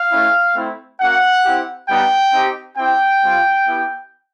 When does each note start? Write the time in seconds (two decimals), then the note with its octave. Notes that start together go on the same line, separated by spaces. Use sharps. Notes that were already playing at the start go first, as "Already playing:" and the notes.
Already playing: F5
0.11 A3 C#4 E4
0.55 A3 C4 E4
1.00 A#3 C#4 F#4 F#5
1.44 C4 E4 G4
1.89 G3 B3 D#4 G5
2.33 C4 D#4 G4
2.77 C4 E4 G4 G5
3.22 G3 C4 F4
3.66 B3 E4 G4